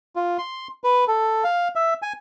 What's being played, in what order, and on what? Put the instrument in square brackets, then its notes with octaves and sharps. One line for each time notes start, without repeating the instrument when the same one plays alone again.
[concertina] F4
C6
B4
A4
F5
E5
G#5